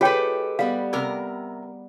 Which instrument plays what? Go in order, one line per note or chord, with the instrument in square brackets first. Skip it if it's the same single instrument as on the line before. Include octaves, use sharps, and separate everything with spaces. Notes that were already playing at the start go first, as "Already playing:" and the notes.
[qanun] G#3 A4 [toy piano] F4 C#5 G5 [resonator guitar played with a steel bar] G4 B4
[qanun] G3 B3 [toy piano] F5
[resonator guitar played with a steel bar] C3 A#4